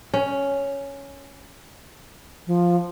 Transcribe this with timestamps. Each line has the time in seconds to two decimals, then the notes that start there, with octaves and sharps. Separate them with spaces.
0.14 C#4
2.47 F3